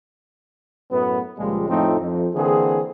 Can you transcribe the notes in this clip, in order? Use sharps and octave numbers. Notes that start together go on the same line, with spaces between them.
F#2 A2 A3 B3
C#2 A#2 F3 G3 G#3
F2 A2 F3 A3 C4 D#4
F2
D3 E3 A#3 C4 G#4